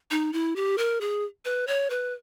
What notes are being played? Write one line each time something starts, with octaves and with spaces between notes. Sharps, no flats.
D#4
E4
G4
A#4
G#4
B4
C#5
B4